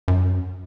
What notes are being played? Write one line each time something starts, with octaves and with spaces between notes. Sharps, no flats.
F#2